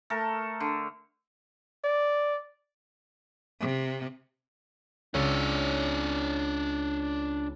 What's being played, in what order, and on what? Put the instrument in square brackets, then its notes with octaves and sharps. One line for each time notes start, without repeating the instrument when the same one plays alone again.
[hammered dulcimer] A3 A4 A#4
D3
[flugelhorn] D5
[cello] C3
[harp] C#2 A6 E7 [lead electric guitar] D4 C#5